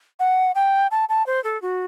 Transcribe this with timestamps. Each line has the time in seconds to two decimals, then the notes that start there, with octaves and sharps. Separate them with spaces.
0.19 F#5
0.55 G5
0.91 A5
1.09 A5
1.26 C5
1.44 A4
1.62 F#4